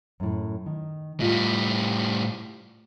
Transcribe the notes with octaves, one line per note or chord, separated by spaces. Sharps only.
F#2 A2
D#3
A2 G3 F4 D#5